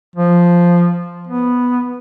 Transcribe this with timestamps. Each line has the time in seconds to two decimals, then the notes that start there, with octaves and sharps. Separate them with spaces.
0.16 F3
1.27 B3